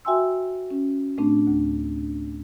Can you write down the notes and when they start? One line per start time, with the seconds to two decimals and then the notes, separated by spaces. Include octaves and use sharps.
0.05 F#4 E5 G5 G#5 C6 E6
0.71 C#4
1.18 A2 A3 C4 D4
1.47 D2